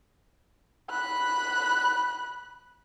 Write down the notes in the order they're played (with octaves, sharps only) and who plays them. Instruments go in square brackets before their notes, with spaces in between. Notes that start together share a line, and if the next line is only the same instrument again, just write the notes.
[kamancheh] B5 F#6